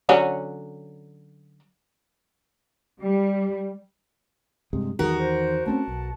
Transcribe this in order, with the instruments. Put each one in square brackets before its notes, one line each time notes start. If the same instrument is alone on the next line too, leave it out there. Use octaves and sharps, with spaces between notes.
[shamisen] D3 F#3 C#4
[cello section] G3
[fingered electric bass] G2 C3 G#3
[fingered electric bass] E2 D#3 [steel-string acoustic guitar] F#4 A#4 [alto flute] G#4
[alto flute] C5
[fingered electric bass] A3 C4 C#4 [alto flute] A5
[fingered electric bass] B1